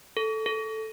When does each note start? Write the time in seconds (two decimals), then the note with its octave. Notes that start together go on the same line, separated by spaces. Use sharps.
0.17 A4
0.46 A4